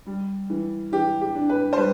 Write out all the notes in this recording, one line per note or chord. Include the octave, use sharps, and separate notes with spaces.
G3
E3
E3 G4
G4
D4
B4
C5
G3 B4